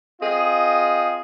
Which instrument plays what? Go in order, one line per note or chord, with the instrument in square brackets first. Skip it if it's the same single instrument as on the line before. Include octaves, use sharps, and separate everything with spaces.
[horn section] C4 F4 G#4 D#5